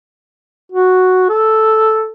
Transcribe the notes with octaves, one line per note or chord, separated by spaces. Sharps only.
F#4
A4